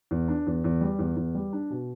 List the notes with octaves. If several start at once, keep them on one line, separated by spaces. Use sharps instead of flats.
E2
D4
E2
E2
G3
E2
E2
G3
D4
B2